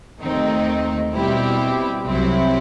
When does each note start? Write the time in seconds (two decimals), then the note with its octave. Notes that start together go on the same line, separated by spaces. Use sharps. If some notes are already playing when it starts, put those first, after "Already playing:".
0.19 D#2 D#3 A3 C4 D#4
1.13 B2 G3 C4 E4 G4
2.06 C2 C3 F#3 C4 E4